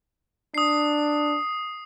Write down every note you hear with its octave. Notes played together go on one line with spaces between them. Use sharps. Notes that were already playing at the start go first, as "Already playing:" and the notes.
D4 D#6 C7